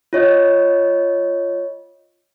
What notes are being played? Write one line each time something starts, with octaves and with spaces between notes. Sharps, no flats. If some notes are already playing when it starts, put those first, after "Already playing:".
F4 C#5 D#5